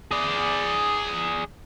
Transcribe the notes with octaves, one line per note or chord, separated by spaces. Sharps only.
G#4 D5